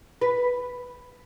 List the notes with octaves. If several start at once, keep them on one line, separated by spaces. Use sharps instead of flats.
B4